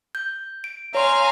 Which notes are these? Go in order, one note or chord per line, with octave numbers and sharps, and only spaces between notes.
G6
D7
C#5 F5 G#5 A#5 C6